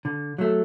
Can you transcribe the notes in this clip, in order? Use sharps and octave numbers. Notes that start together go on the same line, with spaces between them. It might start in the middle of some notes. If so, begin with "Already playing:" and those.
D3
F#3 A3